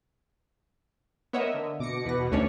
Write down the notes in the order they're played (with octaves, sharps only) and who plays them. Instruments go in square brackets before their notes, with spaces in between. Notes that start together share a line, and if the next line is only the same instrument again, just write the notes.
[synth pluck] B3 C#5 F#5 [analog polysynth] A#4 D#5 E5
[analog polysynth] D3
[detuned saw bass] B2 [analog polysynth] D6 A#6 C#7
[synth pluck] E2 A#6 [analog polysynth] B4
[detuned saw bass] D2 [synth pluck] A3 C#4 D4 [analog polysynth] C#5